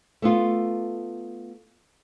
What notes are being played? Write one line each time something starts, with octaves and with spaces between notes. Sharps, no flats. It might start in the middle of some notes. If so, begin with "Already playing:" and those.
A3 B3 F4